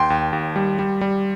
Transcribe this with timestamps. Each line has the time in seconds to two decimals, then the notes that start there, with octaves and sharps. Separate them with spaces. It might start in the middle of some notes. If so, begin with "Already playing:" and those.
Already playing: D#2 G5 C6
0.10 D#2
0.33 D#2
0.56 G3
0.79 G3
1.01 G3